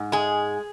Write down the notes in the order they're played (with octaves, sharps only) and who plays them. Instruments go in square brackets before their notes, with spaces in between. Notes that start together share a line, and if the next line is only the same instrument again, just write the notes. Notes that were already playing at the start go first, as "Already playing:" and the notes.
Already playing: [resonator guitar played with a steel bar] G#2
G#3 G#4